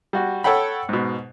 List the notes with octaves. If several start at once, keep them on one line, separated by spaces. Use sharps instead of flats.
G3 F#4
A4 C#5 F#5 G5 B5
G#2 B2